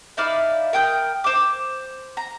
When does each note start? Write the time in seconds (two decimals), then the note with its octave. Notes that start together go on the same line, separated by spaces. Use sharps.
0.17 D#4 E4 D5 F5
0.73 A#4 G5 D#6 G6
1.24 C5 D6
2.17 A#5